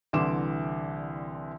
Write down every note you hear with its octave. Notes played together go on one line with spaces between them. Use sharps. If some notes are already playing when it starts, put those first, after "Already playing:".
C2 D3 E3 C6 D6 E7